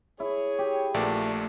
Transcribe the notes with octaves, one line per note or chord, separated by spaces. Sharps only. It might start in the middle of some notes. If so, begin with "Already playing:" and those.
E4 G#4 C#5
G4
A#1 A#2 D3 E3 A3 B3 D5